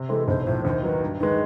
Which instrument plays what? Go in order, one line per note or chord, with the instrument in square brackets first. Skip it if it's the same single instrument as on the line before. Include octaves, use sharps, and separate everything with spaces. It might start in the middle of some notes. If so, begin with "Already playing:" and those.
Already playing: [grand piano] C3
[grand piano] E3 G#3 C4 [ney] A4
[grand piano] B1 [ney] C5
[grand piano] A2 F3 [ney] C5
[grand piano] D#2 [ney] C5
[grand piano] D#3 F#3 [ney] B4
[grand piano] G2
[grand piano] D#3 G#3 [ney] B4